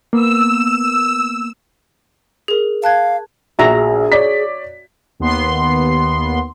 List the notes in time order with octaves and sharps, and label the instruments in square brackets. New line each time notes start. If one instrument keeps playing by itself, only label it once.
[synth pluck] A#3 B3 [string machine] E6
[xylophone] G#4 A#4
[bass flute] F5 [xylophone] A5 F#6 G#6
[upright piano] A#1 [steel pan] F#4 E5 A#5 [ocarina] G#4
[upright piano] C#5 D5 B6
[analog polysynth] D#2 B3 C6